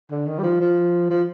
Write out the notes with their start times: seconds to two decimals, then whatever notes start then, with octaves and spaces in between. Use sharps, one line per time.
0.11 D3
0.27 D#3
0.39 G3
0.43 F3
0.61 F3
1.10 F3